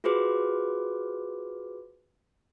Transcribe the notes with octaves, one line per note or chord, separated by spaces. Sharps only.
F4 F#4 G#4 B4 C5 D6